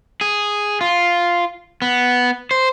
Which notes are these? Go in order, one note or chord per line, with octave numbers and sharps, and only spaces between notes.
G#4
F4
B3
C5